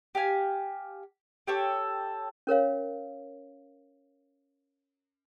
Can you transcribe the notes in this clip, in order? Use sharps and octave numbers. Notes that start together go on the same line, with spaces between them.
G4 F5 G#5
G4 A4 C#5
C#4 A#4 C#5 F5